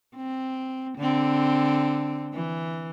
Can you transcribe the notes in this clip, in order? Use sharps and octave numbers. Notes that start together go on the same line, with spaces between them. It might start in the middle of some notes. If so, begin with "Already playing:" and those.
C4
D3 C4
E3